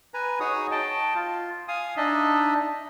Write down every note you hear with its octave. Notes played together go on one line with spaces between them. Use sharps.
B4 G#5 A#5
D#4 F#4 G#4 C#5 D#6
D#5 G5 A5
F4
F5 G#5 D#6
D4 D#4 D#5 E5